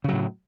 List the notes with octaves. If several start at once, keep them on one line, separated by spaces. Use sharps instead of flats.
A2 C#3 F#3